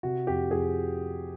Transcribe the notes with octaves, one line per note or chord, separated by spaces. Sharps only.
C3 F#4
F2 G4
F2 G#4